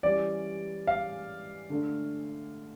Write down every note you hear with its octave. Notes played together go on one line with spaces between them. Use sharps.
E3 G3 C#4 G4 D5
F5
D3 A3 D4 A4